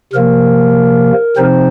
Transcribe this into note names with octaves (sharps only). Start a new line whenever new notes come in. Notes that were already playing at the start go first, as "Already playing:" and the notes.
C3 F3 A#3 A#4
C3 F3 C4 D#4 C5